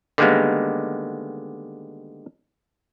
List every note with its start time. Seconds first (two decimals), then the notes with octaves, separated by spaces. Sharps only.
0.18 D3 D#3 G3 G#3 A#3 B3